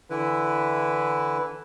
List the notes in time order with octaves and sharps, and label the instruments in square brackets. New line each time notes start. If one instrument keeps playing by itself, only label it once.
[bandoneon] D3 E3 E4 B4